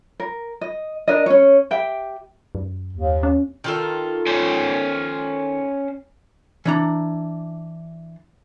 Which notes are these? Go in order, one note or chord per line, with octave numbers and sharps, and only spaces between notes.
A#4
D#5
D4 A#4 D#5
C#4 C#5
G4 E5 G5
F#2
D#2
C#4
D#3 F4 A4
C#4 C5
E3 D4 A#5